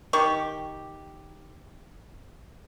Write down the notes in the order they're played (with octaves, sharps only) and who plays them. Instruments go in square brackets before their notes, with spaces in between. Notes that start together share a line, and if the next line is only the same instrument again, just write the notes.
[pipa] D#3 G4 C#6